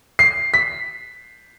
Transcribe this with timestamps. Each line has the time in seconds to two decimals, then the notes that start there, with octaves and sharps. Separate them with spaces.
0.19 C7
0.54 B6